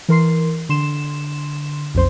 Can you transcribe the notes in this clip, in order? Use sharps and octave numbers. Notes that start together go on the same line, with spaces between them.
E3 A#4 C6 C7
D3 C6 E7
B1 F2 C5 C6